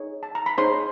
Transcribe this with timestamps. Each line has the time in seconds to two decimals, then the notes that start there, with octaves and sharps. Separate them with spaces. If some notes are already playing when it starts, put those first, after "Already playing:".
Already playing: D#4 G#4 C#5
0.23 A5
0.35 A#5
0.46 B5
0.58 D#4 G#4 C5 C#5 C6